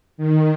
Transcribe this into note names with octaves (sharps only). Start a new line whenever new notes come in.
D#3